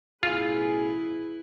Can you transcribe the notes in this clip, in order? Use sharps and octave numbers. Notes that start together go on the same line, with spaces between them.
A1 B2 E4 F4 G#4 B4